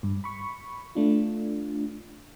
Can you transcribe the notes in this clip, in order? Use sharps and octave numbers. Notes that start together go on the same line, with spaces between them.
G2
B5 C#6
A3 D4 F4